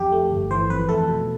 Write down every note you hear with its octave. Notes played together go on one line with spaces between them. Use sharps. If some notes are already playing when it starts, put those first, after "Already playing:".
Already playing: F2 G4
A3
G1
E3 C5
F2 B4
A3 A4
B2